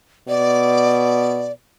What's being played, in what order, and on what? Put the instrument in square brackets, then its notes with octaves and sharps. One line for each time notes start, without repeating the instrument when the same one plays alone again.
[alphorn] B2 [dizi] D5